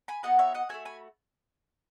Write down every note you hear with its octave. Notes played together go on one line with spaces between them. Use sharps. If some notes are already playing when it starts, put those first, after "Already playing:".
G#5 B5
B3 D#4 F#4 D#5 F#5
C#5 E5
D#5 F#5
A3 C#4 F#4 E5 G#5
G#5 B5